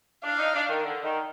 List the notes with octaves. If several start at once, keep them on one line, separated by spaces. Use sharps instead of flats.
D4 F5
D#4
D4
D#3
D3
D#3